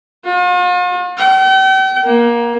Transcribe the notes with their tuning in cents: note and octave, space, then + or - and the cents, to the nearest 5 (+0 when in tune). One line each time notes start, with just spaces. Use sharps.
F4 +45
G5 -45
A#3 +20